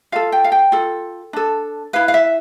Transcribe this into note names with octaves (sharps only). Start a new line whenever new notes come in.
F4 A4 F5
G5
F5
G5
F4 A4
D4 A4
E4 B4 F5
F5
E5